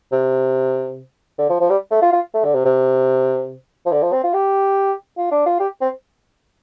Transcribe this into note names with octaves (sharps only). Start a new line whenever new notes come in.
C3
D3
F3
F3
G3
A3
F4
F4
A3
D3
C3
C3
F3
D3
F3
C4
F4
G4
F4
D4
F4
G4
C4